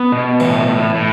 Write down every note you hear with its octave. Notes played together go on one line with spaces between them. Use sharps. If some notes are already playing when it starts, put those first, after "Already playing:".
Already playing: B3
B2
A2 E3
A2
A2